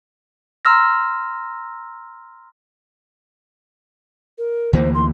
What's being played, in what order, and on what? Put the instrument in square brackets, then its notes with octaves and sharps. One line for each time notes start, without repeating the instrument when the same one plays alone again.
[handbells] A#5 C6 E6 F6 A#6
[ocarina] A#4
[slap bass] D2 E3 A#3 [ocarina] C5
[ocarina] C6